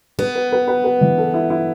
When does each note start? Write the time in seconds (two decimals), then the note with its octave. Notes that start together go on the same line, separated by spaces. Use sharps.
0.18 B3 B4
0.35 B4
0.52 B4
0.68 B4
0.84 B4
1.01 E3
1.18 A4
1.34 E4
1.50 E4